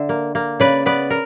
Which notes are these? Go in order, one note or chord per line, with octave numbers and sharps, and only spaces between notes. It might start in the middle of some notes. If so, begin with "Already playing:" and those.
Already playing: D3 E5
A#3
A#3
C#3 B4 D5
B3 B4 D5
A#4